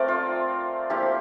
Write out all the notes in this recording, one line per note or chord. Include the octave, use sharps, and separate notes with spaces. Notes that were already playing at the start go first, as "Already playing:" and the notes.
Already playing: F3 A3 C4 A#4 D5
F4
F3 A#3 E4 G4